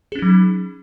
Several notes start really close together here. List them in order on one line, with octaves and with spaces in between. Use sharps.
G#4 C#4 D#4 F#3